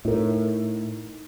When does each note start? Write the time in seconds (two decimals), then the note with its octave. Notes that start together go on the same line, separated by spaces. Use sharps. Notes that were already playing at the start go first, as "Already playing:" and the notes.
0.05 A2 D#4 A#4